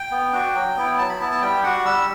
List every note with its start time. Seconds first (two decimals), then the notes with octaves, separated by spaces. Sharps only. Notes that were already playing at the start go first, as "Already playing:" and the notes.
Already playing: G5
0.11 B3
0.33 D4 F#4
0.55 F#3
0.76 B3 E4
0.98 F#3 A5
1.09 B5
1.20 B3 E4 A5
1.32 A5
1.41 G3 G5
1.63 D4 F#4 F#5
1.85 G3 E6